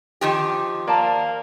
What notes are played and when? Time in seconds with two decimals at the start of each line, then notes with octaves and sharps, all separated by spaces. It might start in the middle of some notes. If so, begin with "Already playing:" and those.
0.21 D#3 F3 G4
0.87 A#3 D5 A5